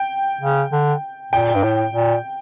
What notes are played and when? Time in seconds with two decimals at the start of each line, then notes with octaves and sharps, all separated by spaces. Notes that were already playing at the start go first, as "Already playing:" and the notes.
Already playing: G5
0.41 C#3
0.72 D3
1.33 A#2 G5
1.55 G2
1.63 A2
1.94 A#2